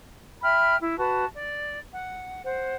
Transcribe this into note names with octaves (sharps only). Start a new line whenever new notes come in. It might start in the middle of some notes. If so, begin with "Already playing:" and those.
E5 G5 B5 F6
E4
F#4 B4 A5
D5
F#5
C5 F#5